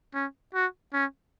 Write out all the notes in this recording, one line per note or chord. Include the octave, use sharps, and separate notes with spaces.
C#4
F#4
C#4